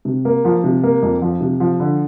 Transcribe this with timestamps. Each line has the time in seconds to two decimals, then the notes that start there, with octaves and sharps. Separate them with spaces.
0.05 C3
0.25 A#3
0.45 F3
0.64 C3
0.84 A#3
1.02 F2
1.22 F3
1.41 C3
1.60 F3
1.80 D3